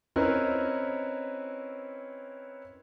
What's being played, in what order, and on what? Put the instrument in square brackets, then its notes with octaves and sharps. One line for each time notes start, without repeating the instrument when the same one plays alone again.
[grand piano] C4 C#4 E4 A#4 B4 D#5